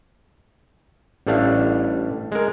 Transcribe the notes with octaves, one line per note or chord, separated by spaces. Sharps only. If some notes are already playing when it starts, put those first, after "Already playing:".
A1 G3 A3 D4 F5
G#3 A#4